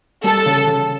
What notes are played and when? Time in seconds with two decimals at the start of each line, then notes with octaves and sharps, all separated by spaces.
0.24 G3 A4
0.46 C#3
0.67 C#3